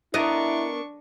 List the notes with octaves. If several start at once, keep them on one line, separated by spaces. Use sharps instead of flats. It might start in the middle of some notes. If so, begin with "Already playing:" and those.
B3 D4 E4 A#4 D#5 C#6